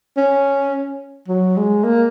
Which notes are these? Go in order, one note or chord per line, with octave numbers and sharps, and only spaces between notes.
C#4
F#3
G#3
A#3